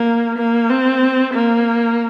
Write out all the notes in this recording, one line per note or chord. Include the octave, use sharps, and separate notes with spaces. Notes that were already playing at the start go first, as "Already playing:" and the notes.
Already playing: A#3
A#3
C4
A#3